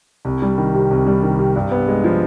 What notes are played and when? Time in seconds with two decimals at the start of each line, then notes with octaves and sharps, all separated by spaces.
0.25 C2
0.42 G3
0.58 D#3
0.74 C3
0.91 C2
1.06 G3
1.22 D#3
1.39 C3
1.56 G2
1.71 B3
1.88 G#3
2.04 F3